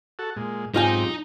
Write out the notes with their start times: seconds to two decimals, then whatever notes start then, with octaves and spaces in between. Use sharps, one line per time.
0.19 F#4 A4
0.36 A#2 G#3
0.74 B1 G#2 C4 D#4 F4 G4 G#5